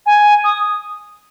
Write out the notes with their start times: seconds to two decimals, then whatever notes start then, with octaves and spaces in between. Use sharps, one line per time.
0.06 G#5
0.44 D#6